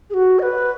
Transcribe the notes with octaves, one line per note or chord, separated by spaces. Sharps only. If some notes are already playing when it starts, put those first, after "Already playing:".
G#4
F#4
D#5
B4